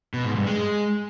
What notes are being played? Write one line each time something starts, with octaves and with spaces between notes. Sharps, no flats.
B2
G#2
G2
G#3